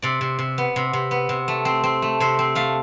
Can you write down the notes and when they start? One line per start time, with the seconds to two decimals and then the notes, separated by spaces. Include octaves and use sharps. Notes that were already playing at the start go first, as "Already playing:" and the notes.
0.02 C3 D5
0.21 C3
0.39 C3
0.58 B3
0.76 C3
0.93 C3
1.11 B3
1.29 C3
1.48 A3
1.65 C4
1.84 C4
2.02 A3
2.20 C3 C5
2.39 C4
2.55 A3 F5